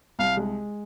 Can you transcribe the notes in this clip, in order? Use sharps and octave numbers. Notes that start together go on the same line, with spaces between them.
C2 F5
G#3